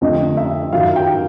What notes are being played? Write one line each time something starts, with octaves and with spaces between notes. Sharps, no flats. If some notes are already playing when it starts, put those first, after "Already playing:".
F2 D3 F3 A3 D#5
E5
F#2 D#3 F#3 F5
G5